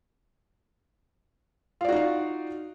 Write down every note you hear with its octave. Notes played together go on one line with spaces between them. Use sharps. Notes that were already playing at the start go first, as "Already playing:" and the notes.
D#4 F4 F#4 D5 F5